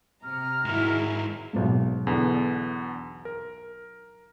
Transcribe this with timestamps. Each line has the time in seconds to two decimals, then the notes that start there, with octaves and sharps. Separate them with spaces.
0.24 C3 A#5 F6
0.65 G#2 D#3 G#3 E4 F#4
1.53 B1 G#2
2.07 E2 D3 B3
3.25 A#4